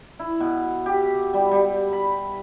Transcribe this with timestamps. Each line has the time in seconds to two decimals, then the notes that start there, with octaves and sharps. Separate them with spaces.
0.19 E4
0.40 B2
0.86 G4
1.34 G3
1.52 G3
1.93 B5